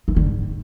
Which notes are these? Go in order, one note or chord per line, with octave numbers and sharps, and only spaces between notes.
E3
D3
G#2